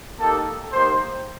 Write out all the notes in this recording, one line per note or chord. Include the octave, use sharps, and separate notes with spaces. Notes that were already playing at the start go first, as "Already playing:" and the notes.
A#3 D#4 G4 A4
A#3 D#4 G4 C5